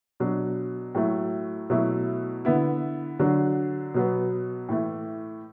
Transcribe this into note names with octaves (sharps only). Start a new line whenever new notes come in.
B2 F#3 D4
A2 F#3 A3
B2 F#3 A3 E4
D3 B3 E4
D3 F#3 D4
B2 F#3 B3
A2 E3 A3